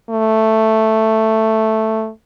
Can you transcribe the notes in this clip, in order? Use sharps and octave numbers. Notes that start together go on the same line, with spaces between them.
A3